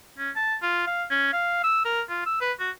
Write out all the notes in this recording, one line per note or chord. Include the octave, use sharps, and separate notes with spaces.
C#4
A5
F4
F5
C#4
F5
E6
A#4
F4
E6
B4
F#4